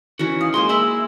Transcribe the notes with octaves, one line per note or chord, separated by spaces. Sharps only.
E3 C#4 D#4 F#4
F5 D#6
G#3 A#3 C5 G#5 C6
E4 G#4 A#4 E5 E6